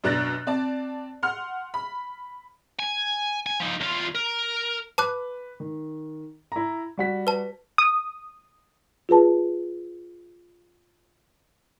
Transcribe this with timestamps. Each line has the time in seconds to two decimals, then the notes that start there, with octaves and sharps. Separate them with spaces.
0.04 F#2 B2 D4 F#6 A6 A#6
0.47 C4 D5 A5
1.23 F#5 C6 F6
1.74 B5
2.79 G#5
3.46 G#5
3.60 F3 D#4
3.81 E2 F4
4.15 A#4
4.98 B4 A5 D6 F#6
5.60 D#3
6.52 E4 A#5
6.98 G3 F#4 B6
7.27 B4 A5
7.78 D#6
9.09 F4 G#4 B4 A5